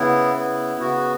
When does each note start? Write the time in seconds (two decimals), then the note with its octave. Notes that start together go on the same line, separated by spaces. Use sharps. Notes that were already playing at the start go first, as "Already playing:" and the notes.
Already playing: C#3 B3 E4
0.34 B3
0.80 C#3 F#4